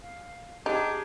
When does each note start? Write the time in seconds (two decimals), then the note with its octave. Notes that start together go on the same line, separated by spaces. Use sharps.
0.02 F5
0.66 D4 D#4 G4 G#4